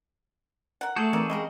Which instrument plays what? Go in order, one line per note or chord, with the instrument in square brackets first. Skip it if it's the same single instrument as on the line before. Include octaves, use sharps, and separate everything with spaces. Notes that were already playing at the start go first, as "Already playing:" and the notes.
[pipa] A#4 F#5
[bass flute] A3 [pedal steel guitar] F#4 G#4 A4 [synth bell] A5 G6 G#6
[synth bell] E3 C4 [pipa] D#4 A#4 D5
[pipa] C#3 G3 A#4 [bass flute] G#3 [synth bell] D#5